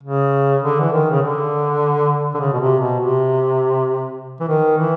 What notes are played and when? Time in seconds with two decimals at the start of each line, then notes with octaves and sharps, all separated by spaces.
0.03 C#3
0.63 D3
0.80 E3
0.92 D#3
1.11 C#3
1.22 D3
2.34 D3
2.40 C#3
2.53 B2
2.60 C3
2.80 B2
3.00 C3
4.40 E3
4.48 D#3
4.78 E3